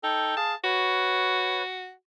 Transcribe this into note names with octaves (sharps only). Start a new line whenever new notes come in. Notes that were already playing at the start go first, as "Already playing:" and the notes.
D#4 A4 G5
G#4 F5 A5
F#4 B4 C#5